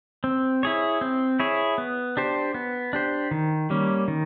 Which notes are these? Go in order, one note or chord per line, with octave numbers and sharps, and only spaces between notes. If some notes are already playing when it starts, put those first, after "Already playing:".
C4
E4 G#4 C#5
C4
E4 G#4 C#5
B3
D4 G4 C5
B3
D4 G4 C5
D#3
G3 A#3 C#4
D#3